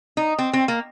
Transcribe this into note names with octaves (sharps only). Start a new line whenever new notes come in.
D#4
C4
C4
A#3